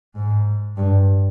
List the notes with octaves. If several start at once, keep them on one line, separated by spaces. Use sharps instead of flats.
G#2
G2